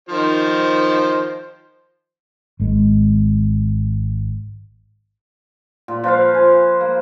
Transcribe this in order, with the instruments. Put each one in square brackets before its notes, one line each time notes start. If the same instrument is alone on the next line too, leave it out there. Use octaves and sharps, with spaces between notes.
[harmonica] D#3 F3 C5
[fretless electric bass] G#1 G#3
[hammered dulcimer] A#2
F3 B4 C5 F5
G#5
A#3